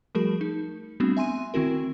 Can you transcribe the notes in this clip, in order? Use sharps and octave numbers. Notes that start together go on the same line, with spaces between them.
F3 G3 A3 F#4 G#4 A#4
D#4
G3 A3 B3 C4 D4 F#4
E5 G#5 C6 D#7
D#3 C4 E4 F#4 A#4